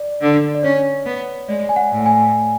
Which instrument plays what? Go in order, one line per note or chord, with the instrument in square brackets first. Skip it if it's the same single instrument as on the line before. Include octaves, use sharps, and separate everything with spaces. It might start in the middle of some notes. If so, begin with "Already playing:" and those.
Already playing: [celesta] D5
[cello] D3
[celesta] D5
[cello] C#4 [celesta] C#5
[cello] B3
[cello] G#3 [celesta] D5
[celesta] G#5
F#5
[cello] A2
[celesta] G#5